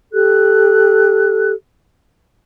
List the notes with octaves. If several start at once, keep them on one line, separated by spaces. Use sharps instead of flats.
G4 A4 F#6